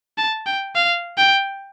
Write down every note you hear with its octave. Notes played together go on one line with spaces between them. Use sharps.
A5
G5
F5
G5